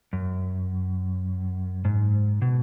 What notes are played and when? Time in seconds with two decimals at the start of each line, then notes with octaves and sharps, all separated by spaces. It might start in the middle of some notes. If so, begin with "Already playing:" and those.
0.13 F#2
1.85 G#2
2.42 B2